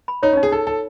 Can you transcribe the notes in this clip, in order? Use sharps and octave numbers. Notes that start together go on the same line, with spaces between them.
B5
D#4 C#5
C#4
D#4
G#4
D#4 A4
D#4 A4